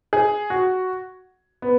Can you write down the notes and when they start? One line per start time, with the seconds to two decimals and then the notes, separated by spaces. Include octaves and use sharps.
0.13 G#4
0.50 F#4
1.62 B3